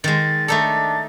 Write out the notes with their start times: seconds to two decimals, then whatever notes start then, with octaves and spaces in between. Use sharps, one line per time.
0.04 D#3 G#3 A6
0.48 A3 D4 D#4 A4